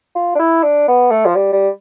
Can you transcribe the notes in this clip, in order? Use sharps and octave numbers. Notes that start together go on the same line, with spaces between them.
F4
D4
E4
D4
B3
A3
F3
G3
G3